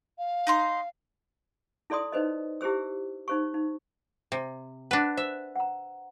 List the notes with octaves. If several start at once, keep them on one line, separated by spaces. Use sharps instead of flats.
F5
D#4 A#5 C6
E4 A4 D5 C6 D#6
D#4 B4 C5 D#5
E4 G4 G#4 C5 E6
D#4 C5 C#6
D#4
C3
D4 B4 F#5
C5 E5
F#5 A#5